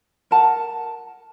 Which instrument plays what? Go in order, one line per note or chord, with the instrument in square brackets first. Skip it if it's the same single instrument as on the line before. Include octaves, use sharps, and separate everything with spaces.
[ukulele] A#4 F#5 A5